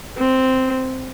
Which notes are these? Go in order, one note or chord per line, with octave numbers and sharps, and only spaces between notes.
C4